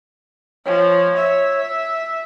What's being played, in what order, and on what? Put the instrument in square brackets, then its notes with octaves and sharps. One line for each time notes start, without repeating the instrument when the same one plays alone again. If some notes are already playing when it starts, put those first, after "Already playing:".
[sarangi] F3 [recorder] C#5
[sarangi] E5